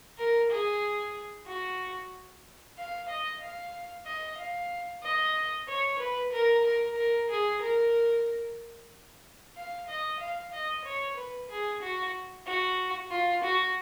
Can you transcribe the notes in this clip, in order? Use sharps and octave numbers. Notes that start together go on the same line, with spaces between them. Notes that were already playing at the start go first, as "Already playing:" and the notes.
A#4
G#4
F#4
F5
D#5
F5
D#5
F5
D#5
C#5
B4
A#4
A#4
A#4
G#4
A#4
F5
D#5
F5
D#5
C#5
B4
G#4
F#4
F#4
F4
F#4